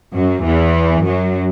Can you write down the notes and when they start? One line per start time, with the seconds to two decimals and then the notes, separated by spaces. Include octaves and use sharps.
0.16 F#2 F#3
0.46 E2 E3
1.05 F#2 F#3